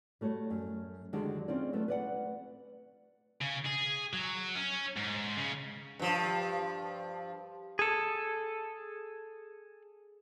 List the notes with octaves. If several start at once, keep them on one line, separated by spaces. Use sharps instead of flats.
G3 A3 F#4 C#5
F#2
D3 D#3 F#3 G#3 D4 G4
C4 C#4 D#4 F4 D5
E3 F#3 A3 B3
B4 D5 F#5
C#3
G#4
F#3
C#4
G#2
C#3
G2 F3
G#4 A4